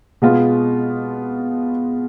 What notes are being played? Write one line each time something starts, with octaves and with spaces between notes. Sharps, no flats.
B2 G#3 B3 F4